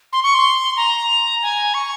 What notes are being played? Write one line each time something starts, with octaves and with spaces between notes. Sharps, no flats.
C6
C#6
C6
A#5
G#5
C#6